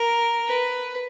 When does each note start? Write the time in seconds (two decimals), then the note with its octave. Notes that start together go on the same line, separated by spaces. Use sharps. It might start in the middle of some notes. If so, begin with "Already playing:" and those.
Already playing: A#4
0.47 B4